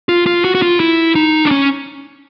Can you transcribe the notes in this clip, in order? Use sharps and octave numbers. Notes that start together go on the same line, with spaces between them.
F4
F4
F#4
F#4
F4
E4
D#4
D4
C#4